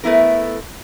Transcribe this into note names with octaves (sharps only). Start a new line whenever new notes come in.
A3 B3 E4 A#4